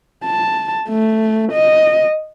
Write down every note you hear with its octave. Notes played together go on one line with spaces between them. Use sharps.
A5
A3
D#5